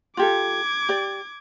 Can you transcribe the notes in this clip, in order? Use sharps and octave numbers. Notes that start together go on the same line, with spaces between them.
F4 G4 A4 D6 G#6
G4 D5